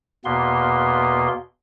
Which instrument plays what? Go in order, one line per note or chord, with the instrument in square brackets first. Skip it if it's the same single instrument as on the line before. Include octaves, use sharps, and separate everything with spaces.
[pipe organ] E2 B2 A#3 B3 C6